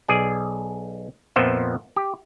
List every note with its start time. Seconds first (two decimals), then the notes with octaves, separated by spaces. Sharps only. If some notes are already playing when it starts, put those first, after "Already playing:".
0.08 B1 G#4 D5 G#5
1.36 F2 A#2 F3 B3 C5 E5
1.96 G4